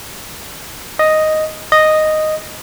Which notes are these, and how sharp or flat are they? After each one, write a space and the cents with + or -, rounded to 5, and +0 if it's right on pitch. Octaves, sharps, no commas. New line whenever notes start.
D#5 +0
D#5 -5